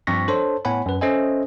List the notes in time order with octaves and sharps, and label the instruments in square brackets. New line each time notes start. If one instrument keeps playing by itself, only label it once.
[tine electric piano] G2 F3 C4 C#6 A#6 B6
D4 A4 C5 C#5 A5 C6
A2 B3 C#5 F#5 G#5 B5
F#2 B4
C#4 A4 C5 D#5 E5 G#5